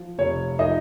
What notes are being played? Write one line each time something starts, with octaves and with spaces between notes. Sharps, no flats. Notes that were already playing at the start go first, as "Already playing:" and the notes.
Already playing: F3
F1 C#5
F3 D#4 D#5